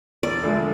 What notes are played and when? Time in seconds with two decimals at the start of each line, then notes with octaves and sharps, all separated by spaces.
0.23 E1 D5
0.43 D2 D3 F3 G#3